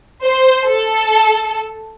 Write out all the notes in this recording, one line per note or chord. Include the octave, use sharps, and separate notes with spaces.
C5
A4